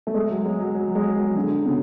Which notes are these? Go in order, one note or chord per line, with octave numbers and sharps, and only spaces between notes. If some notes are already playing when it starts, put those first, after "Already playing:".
A3
G#3
F#3
G#3
F#3
F#3
G#3
F#3
D3
C#3